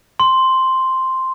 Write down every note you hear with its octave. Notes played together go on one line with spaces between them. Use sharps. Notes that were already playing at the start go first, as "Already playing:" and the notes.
C6